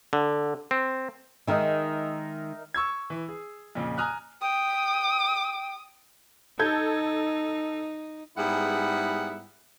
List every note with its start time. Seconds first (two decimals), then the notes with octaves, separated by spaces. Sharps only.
0.13 D3
0.71 C4
1.47 D#3 G#3 D#4 A#4 E5
2.74 C#6 E6 G#6
3.10 E3
3.29 G#4
3.75 F2 A#2 C#3
3.98 G#5 A#5 D#6 F6 F#6
4.42 G5 D#6
6.59 D#4 A4 G6 G#6
8.37 G#2 G3 B3 E4 G#4 F#5